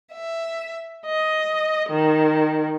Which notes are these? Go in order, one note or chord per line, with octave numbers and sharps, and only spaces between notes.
E5
D#5
D#3